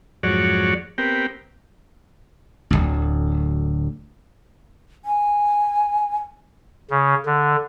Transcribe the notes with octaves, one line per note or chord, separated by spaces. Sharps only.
F2 G#2 F#3 F#4 C#5 D5
B3 C4 G4 A#4 G5
D1 G#1 D2
G#5
C#3
D3